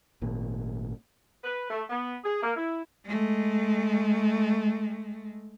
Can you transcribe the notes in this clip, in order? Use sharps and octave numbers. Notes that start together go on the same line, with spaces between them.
G#1 A#2
B4
A3
B3
G#4
A#3
E4
G#3 A3